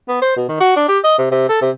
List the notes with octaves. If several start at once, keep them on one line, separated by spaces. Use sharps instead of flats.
B3
C5
B2
D#3
F#4
D4
G4
D#5
C3
C3
A4
C3